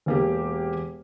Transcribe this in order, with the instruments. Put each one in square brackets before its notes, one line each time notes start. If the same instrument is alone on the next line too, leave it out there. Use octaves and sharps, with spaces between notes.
[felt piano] E1 A#3 G4